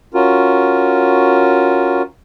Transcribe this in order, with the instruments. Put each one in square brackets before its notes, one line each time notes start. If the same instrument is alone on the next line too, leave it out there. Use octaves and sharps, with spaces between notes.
[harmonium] C#4 F4 F#4 A#4